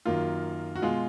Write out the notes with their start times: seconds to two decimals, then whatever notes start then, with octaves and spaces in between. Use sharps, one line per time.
0.06 F#2 D#3 A#3 F4
0.76 F#4
0.82 B2 G#3 F4